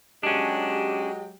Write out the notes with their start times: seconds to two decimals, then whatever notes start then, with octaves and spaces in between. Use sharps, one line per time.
0.23 F#3 G#3 C#4 D4 G4